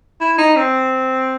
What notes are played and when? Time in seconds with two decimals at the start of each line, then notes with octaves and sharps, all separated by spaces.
0.21 E4
0.38 D#4
0.56 C4